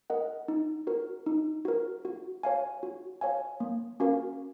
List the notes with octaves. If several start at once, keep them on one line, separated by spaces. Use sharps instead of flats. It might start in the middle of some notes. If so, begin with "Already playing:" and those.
A#4 D#5 F#5
D#4
F#4 A#4
D#4
F#4 A#4
F#4
C#5 F5 G#5
F#4
C#5 F5 G#5
A#3
C#4 F#4 A#4 F5